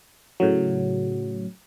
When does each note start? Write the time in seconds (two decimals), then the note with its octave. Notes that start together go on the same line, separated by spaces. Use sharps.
0.40 A2 C#3 F#3